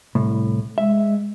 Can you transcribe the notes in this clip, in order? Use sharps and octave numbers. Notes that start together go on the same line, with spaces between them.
C2 A2
G#3 E5